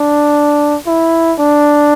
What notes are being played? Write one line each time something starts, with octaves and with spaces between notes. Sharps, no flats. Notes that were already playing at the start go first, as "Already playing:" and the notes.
Already playing: D4
E4
D4